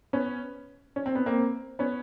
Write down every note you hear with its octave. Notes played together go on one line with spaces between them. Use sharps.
B3 C#4
C#4
C4
B3
A#3 C4
B3 C#4